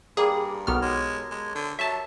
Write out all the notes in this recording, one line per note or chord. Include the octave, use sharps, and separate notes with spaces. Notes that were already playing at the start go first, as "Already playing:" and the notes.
G2 G3 A#3 G#4 G5
B1 B3 F#4 A4 A#4 F6
G#3 G4 C#5
G#3
D3 A#5
F#3 E5 A5